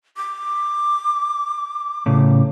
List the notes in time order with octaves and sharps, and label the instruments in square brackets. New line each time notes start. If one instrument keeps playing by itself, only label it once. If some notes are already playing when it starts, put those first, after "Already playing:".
[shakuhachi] D6
[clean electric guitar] A2 C#3